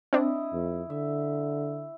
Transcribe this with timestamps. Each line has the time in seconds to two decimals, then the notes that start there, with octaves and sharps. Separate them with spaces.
0.13 C4 D4 E4 D#5
0.53 F2
0.90 D3 E5